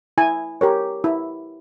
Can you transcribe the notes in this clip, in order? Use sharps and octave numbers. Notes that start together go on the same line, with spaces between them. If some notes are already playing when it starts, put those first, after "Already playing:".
E4 G#5
G4 A#4 C#5
E4